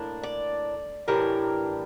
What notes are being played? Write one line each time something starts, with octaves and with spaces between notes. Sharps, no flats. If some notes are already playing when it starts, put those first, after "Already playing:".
Already playing: A2 A#3 D4
D5
A2 E3 G3 D4 A#4